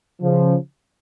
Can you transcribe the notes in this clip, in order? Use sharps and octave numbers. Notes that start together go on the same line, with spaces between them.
C#3 F3